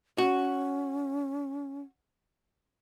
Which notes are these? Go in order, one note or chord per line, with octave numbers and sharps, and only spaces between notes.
C#4 F#4